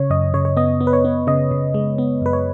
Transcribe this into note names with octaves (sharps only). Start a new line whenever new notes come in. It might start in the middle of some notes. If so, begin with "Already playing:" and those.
Already playing: C#3 C#5
F#2 D#5
C#3 C#5
C#5
B3 D#5
B3
B4
C#5
B3
C#3 D#5
C#3
G#3
B3
F#2 B4
C#5